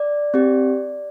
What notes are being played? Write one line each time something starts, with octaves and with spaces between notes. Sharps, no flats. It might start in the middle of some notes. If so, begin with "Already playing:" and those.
Already playing: D5
C4 G4